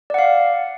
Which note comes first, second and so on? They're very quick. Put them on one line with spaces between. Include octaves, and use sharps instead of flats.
D5 F#5 F5